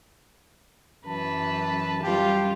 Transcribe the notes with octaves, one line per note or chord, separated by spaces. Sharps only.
F#2 E3 B4 A5
F#2 G3 F4 G4